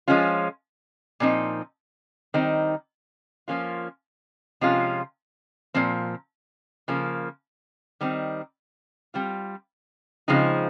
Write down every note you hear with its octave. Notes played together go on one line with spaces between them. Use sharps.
F3 G#3 C#4 F4
A#2 F3 C4 D#4
D#3 G3 C4 D#4
F3 A#3 C#4 F4
C3 F3 G#3 C#4 F4
A#2 F3 C4
C#3 F3 A#3
D#3 G3 C4 D#4
G3 C4 F4
C#3 F3 G#3 C4 D#4